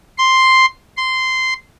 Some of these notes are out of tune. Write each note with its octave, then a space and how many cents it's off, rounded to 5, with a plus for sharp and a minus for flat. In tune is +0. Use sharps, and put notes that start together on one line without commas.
C6 +0
C6 -10